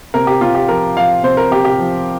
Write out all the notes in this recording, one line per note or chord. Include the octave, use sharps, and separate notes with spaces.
C3 A#4
G4
C3 F4
G4
F3 A#4
F3 F5
C3 C5
A#4
C3 G4
G4
F3